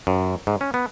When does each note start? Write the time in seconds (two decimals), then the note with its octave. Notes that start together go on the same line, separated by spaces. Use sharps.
0.07 F#2
0.47 G#2
0.61 C#4
0.74 B3